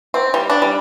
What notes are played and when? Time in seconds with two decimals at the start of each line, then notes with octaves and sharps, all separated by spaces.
0.14 C4
0.34 G3
0.50 D4
0.62 G3